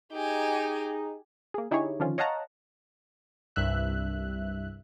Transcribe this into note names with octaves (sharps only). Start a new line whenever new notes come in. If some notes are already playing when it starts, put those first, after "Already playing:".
D#4 G4 G#4 G#5
A#3 G#4
D3 D#4 E4 G4 G#4 C#5
D3 D#3 F3 C#4 F4
C#5 D#5 F5 F#5 A5 A#5
C2 G2 E5 F#6